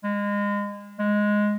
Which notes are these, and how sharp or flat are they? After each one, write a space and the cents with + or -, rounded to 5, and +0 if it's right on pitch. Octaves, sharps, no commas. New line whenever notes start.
G#3 -30
G#3 +0